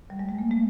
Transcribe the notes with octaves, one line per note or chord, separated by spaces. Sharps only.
G3
G#3
A3
A#3
A3